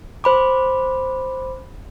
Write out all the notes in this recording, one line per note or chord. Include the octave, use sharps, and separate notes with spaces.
C5 B5 D6